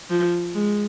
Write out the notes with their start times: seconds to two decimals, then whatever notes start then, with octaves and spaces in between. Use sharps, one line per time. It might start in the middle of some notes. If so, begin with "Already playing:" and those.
0.10 F3
0.55 G#3